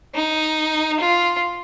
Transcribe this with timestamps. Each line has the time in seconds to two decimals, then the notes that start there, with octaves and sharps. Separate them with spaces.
0.15 D#4
1.00 F4